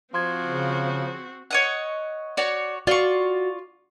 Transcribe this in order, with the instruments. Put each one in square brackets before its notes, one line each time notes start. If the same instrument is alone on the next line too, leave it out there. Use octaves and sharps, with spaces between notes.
[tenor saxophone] F3 [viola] C4 F#4 [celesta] C6 G#6
[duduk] C#3
[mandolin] C#5 D#5 F#5
[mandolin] F#4 C#5 [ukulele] D5
[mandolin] F4 C#6 [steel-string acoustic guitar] F#4 [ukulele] D5